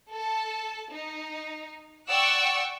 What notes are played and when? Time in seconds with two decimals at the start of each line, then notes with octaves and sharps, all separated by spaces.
0.11 A4 A5
0.91 D#4
2.09 D5 F#5 G5 C#6 E6